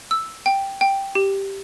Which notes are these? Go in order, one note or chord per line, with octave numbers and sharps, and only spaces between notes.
E6
G5
G5
G4